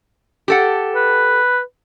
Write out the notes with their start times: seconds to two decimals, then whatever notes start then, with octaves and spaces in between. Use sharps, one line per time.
0.48 G4 A4 F#5
0.95 B4